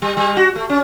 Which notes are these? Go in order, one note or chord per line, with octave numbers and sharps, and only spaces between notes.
G3
G3
F#4
A3
C#4